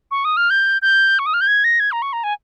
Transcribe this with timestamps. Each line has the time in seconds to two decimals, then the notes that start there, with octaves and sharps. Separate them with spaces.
0.11 C#6
0.25 D#6
0.37 F6
0.50 G6
0.82 G6
1.19 C#6
1.26 D#6
1.34 F6
1.41 G6
1.47 G#6
1.64 A#6
1.80 G#6
1.92 A#5
2.02 C#6
2.13 A#5
2.24 G#5